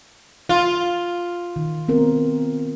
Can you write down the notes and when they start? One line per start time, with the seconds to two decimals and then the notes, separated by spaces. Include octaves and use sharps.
0.49 F4 F5
1.56 D#3
1.88 B3 C4 A#4